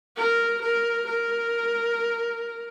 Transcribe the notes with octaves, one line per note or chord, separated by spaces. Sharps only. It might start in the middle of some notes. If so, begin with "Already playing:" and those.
A#4
A#4
A#4